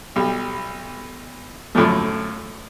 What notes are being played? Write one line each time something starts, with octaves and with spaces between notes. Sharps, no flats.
B1 G3
F#2 A2 D3 F3 A3